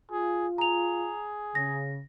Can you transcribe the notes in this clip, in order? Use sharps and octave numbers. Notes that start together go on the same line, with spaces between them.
F4 G#4
G#4 A#5 F7
C#3 A#6